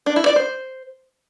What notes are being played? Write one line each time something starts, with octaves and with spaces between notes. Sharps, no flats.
D4
E4
D5
C5